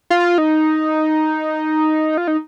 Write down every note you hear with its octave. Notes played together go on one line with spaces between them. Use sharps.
F4
D#4
F4
D#4